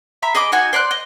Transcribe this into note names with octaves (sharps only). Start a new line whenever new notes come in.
E5 A#5 B5
G#4 D#5 B5 D6
D#4 F#4 G#5
C5 D5 A#5 F#6
D#5